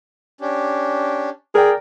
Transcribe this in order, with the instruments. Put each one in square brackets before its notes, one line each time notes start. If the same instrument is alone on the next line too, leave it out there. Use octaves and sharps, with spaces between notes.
[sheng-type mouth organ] C#4 D4 G4
[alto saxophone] G#4 [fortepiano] A#4 D5 G5